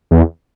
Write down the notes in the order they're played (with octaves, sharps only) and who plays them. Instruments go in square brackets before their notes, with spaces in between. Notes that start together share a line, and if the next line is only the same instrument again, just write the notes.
[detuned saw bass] E2